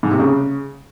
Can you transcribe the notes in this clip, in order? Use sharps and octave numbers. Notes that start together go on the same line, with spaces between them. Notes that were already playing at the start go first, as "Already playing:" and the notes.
G#2
C3
C#3